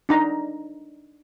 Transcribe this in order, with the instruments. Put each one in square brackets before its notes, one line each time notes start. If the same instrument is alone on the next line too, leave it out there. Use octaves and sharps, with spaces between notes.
[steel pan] D4 D#4 A#5